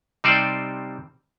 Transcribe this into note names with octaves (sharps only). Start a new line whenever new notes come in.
C3 G3 C4 D#4 C5 D5